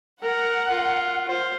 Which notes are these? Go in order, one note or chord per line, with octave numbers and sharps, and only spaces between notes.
A#4 F#5
F4
F4 C5